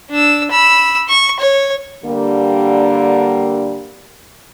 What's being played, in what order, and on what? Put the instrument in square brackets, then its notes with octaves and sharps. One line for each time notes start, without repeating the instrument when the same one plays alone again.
[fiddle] D4 E6
B5 E6
C#6
C#5
[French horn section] D3 G3 A#3